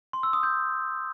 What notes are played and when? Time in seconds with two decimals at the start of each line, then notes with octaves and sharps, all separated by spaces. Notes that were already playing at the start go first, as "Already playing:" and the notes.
0.13 C6
0.23 E6
0.33 D#6
0.43 G6